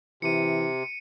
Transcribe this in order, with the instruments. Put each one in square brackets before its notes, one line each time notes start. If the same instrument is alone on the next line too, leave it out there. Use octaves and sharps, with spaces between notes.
[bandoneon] C3 [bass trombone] E3 [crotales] C#7 D#7